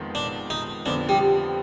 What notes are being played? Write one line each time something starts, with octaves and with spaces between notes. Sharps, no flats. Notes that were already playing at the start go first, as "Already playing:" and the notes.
Already playing: F2 D#3 G#3 B3 F4
D4
D#4
F2 D3 F3 B3 D4
G3